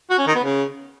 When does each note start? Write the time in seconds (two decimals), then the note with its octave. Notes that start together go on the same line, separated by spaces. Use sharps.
0.10 F#4
0.18 C#4
0.27 D#3
0.35 B3
0.44 C#3